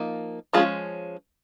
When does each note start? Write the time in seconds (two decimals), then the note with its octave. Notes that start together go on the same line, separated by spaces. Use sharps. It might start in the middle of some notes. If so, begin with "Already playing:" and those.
Already playing: F3 A#3 D#4
0.53 F3 G#3 C#4 F4 G#4